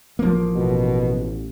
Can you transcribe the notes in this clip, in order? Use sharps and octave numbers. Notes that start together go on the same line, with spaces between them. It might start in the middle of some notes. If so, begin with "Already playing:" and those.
A1 F3 A#3
A1 B2